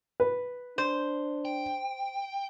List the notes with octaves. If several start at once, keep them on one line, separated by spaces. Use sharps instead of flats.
B4
D4 C5
G5